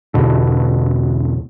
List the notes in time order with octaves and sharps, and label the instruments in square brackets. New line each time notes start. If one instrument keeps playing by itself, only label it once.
[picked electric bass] B1 E2 B2 D3